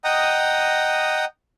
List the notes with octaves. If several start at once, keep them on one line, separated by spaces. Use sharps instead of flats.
D#5 F#5 G5 A#5 D#6